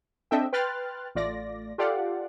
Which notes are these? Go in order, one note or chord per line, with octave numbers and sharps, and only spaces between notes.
C4 D4 A4 D#5 E5 G5
B4 G5 C6 F6 F#6 A6
A1 A3 F4 D5 A#6
F4 G4 A4 D5 F5 F#5